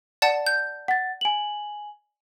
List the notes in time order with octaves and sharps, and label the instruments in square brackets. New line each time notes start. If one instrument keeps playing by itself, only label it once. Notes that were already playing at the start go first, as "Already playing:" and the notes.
[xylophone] D5 F#5 A5
G6
[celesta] F#5 A6
G#5 F#7